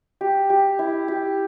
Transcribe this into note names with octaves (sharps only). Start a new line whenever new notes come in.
G4
G4
E4
G4